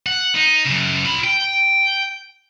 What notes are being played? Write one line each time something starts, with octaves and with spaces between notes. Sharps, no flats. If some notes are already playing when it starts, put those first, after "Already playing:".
F#5
D#4
F#2 C#3
F4 B5
G5